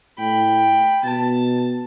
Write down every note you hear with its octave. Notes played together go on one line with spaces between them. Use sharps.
A2 G5 B5
B2 A5